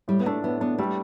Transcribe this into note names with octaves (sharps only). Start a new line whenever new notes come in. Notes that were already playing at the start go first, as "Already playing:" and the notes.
A2 G3
B3
A3 D4
A2 B3
B3 D4
G3 A3